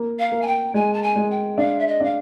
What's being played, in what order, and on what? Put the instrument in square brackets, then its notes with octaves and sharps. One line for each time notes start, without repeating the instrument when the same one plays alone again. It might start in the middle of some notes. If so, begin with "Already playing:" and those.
Already playing: [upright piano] A#3
[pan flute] F5
[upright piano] A#3
[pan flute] G#5
G5
[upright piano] G#3 [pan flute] G#5
[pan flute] A5
G#5
[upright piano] G#3
[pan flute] G5
[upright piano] D4 [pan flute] F5
[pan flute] E5
D#5
[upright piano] D4 [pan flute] F5